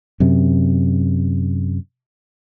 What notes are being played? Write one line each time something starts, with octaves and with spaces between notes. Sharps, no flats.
F#2 C3